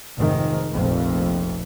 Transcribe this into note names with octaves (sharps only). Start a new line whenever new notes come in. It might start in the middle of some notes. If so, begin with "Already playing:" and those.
F1 G#2 D#3
F1 A#1 F2